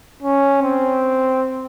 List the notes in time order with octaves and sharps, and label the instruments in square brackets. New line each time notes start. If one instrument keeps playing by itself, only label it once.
[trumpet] C#4
C4